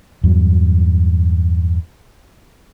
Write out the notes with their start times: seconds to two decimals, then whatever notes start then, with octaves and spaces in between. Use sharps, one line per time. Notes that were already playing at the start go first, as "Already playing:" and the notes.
0.24 E2 G2 F#3